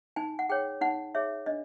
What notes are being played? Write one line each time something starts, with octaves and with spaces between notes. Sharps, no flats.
D#4 G#5
F#5
G#4 C#5 G5
D#4 F#5
G#4 C#5 E5
D4 D#5